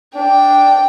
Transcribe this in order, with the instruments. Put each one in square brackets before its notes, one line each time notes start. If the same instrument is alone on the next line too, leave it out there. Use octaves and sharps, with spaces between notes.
[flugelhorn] D4 [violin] G5